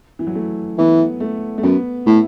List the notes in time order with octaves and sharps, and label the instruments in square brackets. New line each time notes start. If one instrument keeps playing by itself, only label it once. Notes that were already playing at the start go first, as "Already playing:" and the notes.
[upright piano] E3
F#3
A3
[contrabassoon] E3 [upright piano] B3
[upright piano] A3
A3
[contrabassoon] F#2 [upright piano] B3
[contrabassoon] A2 [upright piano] E4